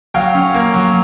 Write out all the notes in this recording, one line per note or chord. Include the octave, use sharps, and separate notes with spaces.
F#3 F5 G5
C#4
A#3
F#3